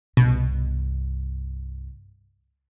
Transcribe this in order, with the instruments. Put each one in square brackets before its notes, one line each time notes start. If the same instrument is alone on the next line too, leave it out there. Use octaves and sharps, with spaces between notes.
[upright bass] C2 G2 [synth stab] B2